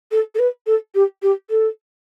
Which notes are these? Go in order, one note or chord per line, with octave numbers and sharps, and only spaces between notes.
A4
A4
B4
A4
G4
G4
A4